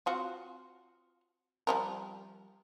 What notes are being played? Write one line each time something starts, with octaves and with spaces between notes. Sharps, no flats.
C4 F4 F#4
F3 G3 A#4